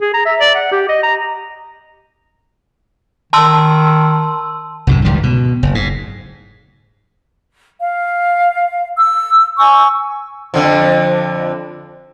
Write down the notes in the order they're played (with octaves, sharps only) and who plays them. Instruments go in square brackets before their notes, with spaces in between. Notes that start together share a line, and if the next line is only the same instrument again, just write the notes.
[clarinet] G#4
A#5
E5
D5
F#5
G4
D#5
A#5
[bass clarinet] D#3 [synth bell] A5 C6 E6
[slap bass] C2 F#2 A2
C#2 G#2 D#3 G3
B2
F#1
G#2
[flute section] F5
E6
G#5 C#6 E6
[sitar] F2 D3 F3